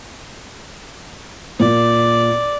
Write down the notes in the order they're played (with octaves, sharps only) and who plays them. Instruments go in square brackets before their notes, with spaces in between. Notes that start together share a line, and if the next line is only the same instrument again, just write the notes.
[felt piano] A#2 [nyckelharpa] D5